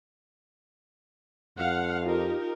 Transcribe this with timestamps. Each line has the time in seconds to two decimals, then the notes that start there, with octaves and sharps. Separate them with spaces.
1.58 F2 F5 F#5
2.06 D#4 F4 G4 A#4